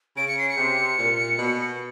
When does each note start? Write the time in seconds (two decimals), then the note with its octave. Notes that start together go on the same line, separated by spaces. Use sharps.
0.17 C#3 D7
0.28 C#7
0.39 C7
0.49 C#7
0.58 C3
0.99 A#2
1.38 B2